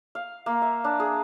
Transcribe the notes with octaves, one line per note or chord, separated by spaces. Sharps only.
F5
A#3
E5
D4
G#4